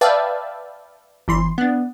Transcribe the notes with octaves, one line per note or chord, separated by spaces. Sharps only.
B4 D5 E5 F5 G5 A5
G1 E3 C6
B3 D4